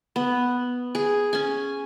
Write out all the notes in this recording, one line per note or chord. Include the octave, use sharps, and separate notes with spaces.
B3
G#4
C#4 G#5